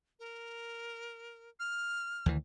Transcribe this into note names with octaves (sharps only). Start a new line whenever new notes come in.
A#4
F6
D2 D#3 E3